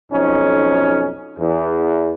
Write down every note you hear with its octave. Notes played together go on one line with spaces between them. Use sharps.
B1 F2 C#4 D#4
E2